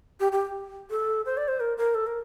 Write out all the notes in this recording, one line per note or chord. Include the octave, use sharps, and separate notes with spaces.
G4
G4
A4
C5
D5
C5
A#4
A#4
A4
A#4